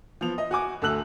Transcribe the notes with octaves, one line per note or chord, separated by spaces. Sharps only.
F3 B3 F7
D#5
F#4 G#5 D6
D2 A3 A5 E6 F#6 F#7